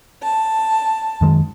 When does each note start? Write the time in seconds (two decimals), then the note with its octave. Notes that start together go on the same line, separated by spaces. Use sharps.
0.23 A5
1.21 F#2 D#3 G#3